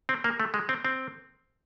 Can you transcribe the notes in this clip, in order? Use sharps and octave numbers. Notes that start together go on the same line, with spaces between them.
C4
A#3
A3
G#3
C4
C4